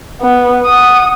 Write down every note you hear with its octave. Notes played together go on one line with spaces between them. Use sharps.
B3
F#5 D#6